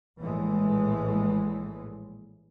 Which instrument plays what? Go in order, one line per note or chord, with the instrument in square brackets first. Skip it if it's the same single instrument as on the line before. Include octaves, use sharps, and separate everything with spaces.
[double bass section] A#1 A2 E3 G#3